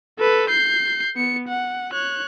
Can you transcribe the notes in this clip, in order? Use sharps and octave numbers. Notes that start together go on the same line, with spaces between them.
A4 B4
G6 C7
B3 C#7
F#5
C#5 F#6